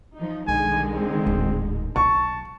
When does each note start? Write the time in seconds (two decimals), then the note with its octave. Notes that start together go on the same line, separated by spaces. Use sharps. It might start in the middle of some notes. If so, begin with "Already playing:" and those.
0.16 F3 D#4
0.48 B1 D3 D#3 G#3 G#5
0.96 C4
1.26 D1 G#1
1.96 B1 A5 C#6